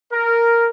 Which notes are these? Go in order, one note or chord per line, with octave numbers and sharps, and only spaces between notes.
A#4